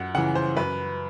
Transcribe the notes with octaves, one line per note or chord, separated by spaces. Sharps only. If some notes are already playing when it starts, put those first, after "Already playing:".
Already playing: F#2 F#5
C#3 E3 F#5
C5
F#2 B4